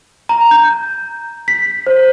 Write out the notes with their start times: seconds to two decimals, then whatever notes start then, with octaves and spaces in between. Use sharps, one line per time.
0.29 A#5
0.51 G6
1.48 B6
1.87 C5